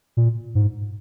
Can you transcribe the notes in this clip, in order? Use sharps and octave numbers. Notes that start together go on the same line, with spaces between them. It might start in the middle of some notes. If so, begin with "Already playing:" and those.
A#2
G#2